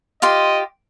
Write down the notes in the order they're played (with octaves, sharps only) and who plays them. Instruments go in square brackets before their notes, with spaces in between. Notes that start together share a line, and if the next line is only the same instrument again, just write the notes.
[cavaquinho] F4 G4 C6 [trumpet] D#5